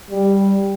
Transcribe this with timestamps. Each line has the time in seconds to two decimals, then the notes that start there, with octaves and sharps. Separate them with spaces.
0.10 G3